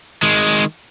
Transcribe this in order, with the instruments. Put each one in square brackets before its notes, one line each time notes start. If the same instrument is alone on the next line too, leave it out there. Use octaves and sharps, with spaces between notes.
[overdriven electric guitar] D#3 G#3